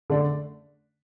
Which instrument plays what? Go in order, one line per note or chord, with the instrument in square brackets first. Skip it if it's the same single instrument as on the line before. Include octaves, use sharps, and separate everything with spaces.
[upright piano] D3 A3 D4